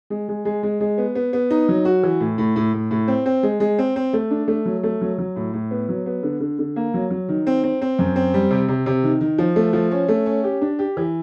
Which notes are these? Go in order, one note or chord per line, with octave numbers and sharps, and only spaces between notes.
G#3
G#3
G#3
G#3
G#3
B3
B3
B3
D#4
F#3
F#4
E3
A2
A2
A2
A2
A2
C4
C4
G#3
G#3
C4
C4
A3
D4
A3
F#3
A3
F#3
F#3
A2
A2
B3
F#3
B3
D3
D3
D3
A#3
F#3
F#3
D#3
C4
C4
C4
F#2
C4
G3
C3
C3
C3
D#3
D#3
F3
A3
F3
C#4
A3
C#4
G4
D4
G4
E3